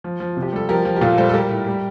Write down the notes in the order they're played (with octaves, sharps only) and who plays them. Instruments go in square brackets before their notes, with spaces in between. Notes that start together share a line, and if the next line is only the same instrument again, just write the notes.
[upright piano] F3
F3
C3
G4
G3 A4
F3 G4 A#4
F3
G4
A#2 F4 A4
G3 A4 C5
A4
G3 G4 A#4
A2
G3